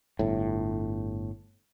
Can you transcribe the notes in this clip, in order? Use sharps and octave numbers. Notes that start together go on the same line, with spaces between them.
G1 A2